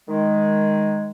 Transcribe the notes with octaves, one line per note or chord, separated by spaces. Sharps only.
D#3 G#3